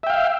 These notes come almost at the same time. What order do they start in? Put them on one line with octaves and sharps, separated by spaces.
E5 G5 F5